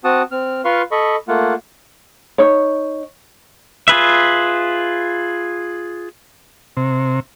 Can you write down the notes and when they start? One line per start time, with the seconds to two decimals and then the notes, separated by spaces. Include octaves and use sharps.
0.04 C4 F#4 F#5 A5 D#6
0.31 C4 F6
0.65 F4 B4 F5 C6 C#6 F6
0.91 A4 D#5 B5 C#6
1.28 A3 A#3 F4 F#5
2.38 D#4 C#5
3.88 F4 G#4 B4 E5
6.77 C3